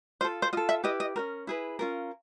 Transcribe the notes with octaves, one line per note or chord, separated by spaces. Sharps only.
F4 A4 C5
C5
F4 A4 D#5
E5
E4 G4 B4 D#5
D#5
C#4 F#4 A#4
E4 G#4 B4
C#4 F4 A#4